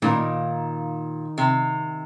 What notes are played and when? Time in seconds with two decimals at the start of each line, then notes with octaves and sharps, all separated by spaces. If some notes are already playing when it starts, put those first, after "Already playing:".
0.02 A#2 D#3 A#3 D#4 A#4
1.38 C3